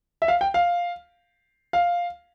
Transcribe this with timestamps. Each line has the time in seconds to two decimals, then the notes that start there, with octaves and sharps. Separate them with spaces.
0.22 E5
0.28 F5
0.41 G5
0.54 F5
1.73 F5